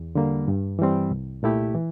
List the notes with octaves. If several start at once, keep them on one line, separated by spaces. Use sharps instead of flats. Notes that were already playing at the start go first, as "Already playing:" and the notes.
Already playing: E2
D3 G3 A#3
G2
E3 G3 C4
C2
A#2 A3 E4 G4
E3